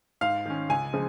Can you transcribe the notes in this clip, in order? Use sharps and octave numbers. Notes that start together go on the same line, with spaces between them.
G#2 F5
D#3 C#4
C#2 G#5
C#3 F3 G#3